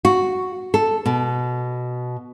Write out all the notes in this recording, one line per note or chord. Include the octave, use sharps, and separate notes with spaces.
F#4
A4
B2